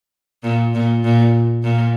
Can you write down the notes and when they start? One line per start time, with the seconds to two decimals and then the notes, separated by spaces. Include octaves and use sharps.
0.43 A#2
0.74 A#2
1.04 A#2
1.63 A#2